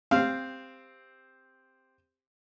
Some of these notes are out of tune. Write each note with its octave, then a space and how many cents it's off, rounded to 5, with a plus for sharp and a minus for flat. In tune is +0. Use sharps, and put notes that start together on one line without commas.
C4 +0 G4 +20 F5 -10